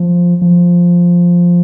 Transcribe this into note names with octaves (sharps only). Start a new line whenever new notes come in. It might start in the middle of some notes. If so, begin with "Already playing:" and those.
Already playing: F3
F3